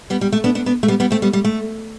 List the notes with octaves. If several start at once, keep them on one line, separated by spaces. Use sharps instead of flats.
G3 B3
G3
A3
B3 D4
B3 D4
B3 D4
A3
G3 B3
G3 B3
A3 C4
G3 B3
G3
A3